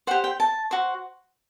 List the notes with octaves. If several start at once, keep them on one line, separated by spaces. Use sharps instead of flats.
G4 C5 F#5
G5
A5
F#4 C5